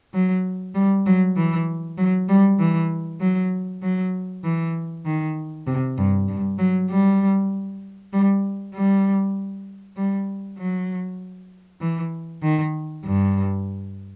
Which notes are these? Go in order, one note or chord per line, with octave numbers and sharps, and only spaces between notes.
F#3
G3
F#3
E3
F#3
G3
E3
F#3
F#3
E3
D#3
C3
G2
G2
F#3
G3
G3
G3
G3
F#3
E3
D#3
G2